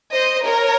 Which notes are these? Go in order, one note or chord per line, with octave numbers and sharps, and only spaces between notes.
C5 D#5
A#4 C#5